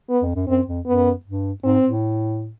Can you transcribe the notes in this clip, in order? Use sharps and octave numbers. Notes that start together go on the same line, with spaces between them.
B3
F2
F#2
F#2 C4
F2
F#2 B3
G2
G#2 C4
A2